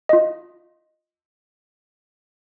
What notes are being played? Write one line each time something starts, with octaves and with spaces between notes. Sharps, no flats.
F4 D#5